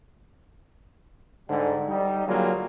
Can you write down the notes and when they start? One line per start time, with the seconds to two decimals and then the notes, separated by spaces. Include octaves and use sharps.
1.49 G#2 D3 G3
1.89 G3 D#4
2.27 D3 F#3 G3 A#3 F4 G#4